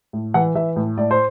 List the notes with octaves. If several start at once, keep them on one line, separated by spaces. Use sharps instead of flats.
A2
E3 F#5
E3 E5
A2
A2 D5
C5